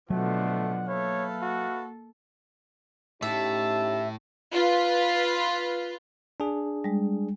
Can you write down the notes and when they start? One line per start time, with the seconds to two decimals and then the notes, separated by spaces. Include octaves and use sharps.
0.10 B2 D3 F3 F#3 A3 F#5
0.88 A#3 A4 B4 C#5 E5 F5
1.42 F#4
3.22 A2 C#4 D#4 G4 E5 A5
4.53 F4 B4
6.40 D4 G#4
6.84 G3 G#3